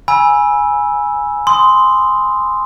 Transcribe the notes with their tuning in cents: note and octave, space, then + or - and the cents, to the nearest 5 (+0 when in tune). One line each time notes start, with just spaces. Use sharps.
G#5 +0 B5 -25 E6 +0
C6 -10 D#6 +0